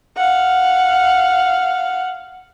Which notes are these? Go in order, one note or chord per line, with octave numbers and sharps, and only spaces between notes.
F5 F#5